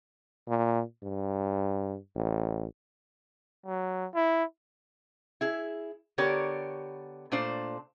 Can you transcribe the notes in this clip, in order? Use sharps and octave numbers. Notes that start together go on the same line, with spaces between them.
A#2
G2
A1
F#3
E4
E4 G#4
D3 B3 G4 A#4 C#5 D5
A#2 A3 D4 C5